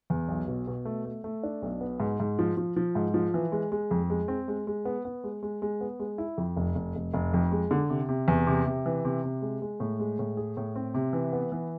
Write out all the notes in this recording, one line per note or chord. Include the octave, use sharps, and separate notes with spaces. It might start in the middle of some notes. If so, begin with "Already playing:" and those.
E2
B1
B2
B2
A3
A3
A3
D4
B1
B3
G#2
G#2
F3
F3
F3
G#2
F3
E3
G#3
G#3
F2
G#3
C4
G#3
G#3
B3
B3
G#3
G#3
G#3
B3
G#3
E4
F2
F1
F1
F1
F1
F2
G#3
D3
C3
C3
E2
C3
C3
E3
C3
C3
G#3
G#3
A2
G#3
A2
G#4
A2
C4
C3
E3
B3
E3